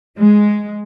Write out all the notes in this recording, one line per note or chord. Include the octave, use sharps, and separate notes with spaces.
G#3